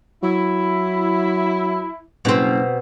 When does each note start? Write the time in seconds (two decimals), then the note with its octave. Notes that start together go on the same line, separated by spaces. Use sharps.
0.23 F#3 E4
2.25 F#1 B2 C4